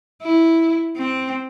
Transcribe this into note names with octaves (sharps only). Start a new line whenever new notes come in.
E4
C4